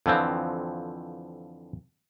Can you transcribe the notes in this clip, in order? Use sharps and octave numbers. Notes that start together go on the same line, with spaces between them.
F2 D3 E3 F3 C4